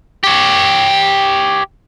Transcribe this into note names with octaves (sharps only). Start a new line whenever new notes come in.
G4 C#5